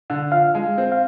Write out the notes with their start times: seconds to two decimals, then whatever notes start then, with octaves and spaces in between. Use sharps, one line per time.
0.10 D3
0.32 F3 F5
0.55 G#3
0.78 C4
0.92 F5